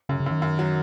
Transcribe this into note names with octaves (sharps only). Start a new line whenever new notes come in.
F#2 C#3
C#3
F#2 D#3
F#2
F#3